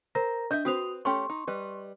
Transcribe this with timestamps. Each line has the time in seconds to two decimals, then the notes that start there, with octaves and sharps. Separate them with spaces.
0.15 A#4 C5 A#5 A#6
0.51 D4 D#5 E5 G6
0.65 C4 F#4 B4 C5 D#6 F7
1.05 A3 C#4 G4 C6 C#6
1.29 D#4
1.47 G3 B4 D#5